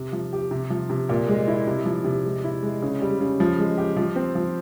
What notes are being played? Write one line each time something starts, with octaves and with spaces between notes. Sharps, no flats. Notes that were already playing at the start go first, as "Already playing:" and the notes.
Already playing: C3
F3
G4
C3
F3
C3
A#2
G#3
E4
C3
F3
C3
G#3
E4
G#3
C#3
G3
C#3
F3
G#3
G4
F3
C4
F3